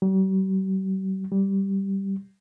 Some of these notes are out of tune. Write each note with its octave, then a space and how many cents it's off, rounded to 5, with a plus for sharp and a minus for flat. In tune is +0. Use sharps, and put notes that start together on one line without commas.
G3 -45
G3 -5